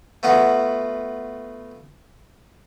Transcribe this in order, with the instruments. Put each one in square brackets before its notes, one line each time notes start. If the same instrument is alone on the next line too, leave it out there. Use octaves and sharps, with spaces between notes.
[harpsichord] A3 B3 F4 F#4